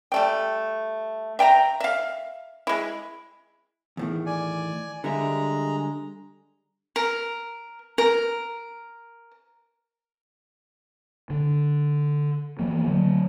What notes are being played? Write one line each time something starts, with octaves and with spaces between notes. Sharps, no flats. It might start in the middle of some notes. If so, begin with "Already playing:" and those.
G3 A3 G5
E5 G5 A5 A#5
E5 F5
G#3 E4
E2 A2 D#3
D5 G#5
D3 G3 G#3 E5 A#5
A#4
A#4
D3
E3 F3 A#3
D3 F#3